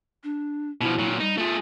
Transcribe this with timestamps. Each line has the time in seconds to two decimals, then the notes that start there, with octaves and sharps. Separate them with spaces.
0.23 D4
0.81 B2 F3 E4
0.99 A#2 F#3
1.20 G3 D#4
1.38 A3 F4 G#4